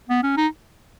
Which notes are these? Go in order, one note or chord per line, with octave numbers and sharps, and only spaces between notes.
B3
C#4
D#4